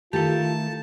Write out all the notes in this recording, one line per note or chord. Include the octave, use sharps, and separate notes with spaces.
D#3 A3 E4 F4 G4 A4 A5